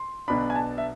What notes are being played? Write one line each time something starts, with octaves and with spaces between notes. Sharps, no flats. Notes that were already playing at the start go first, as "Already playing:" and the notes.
Already playing: C6
B1 B2 B3 D4 B5
G#5
A5
E5